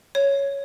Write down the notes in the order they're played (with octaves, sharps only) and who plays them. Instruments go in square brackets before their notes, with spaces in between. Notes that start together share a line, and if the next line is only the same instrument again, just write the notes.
[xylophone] C#5